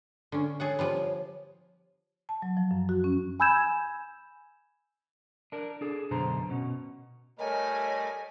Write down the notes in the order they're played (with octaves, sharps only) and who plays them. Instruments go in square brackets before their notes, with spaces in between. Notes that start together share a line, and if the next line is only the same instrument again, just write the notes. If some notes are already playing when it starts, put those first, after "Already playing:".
[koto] D3 C#4
[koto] G#4 A4 F#5 [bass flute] C#5
[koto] F3 G3 B3
[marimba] A5
F#3
F3
F#2
F#4
C#4
[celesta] G#5 B5 E6 G6 G#6 E7
[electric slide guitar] D4 A#4
D4 G#4 A4
F#2 B2 D3 C5 A#5
B2 C#4
[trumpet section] G3 A3 A#4 [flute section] C#5 D#5 [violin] G#5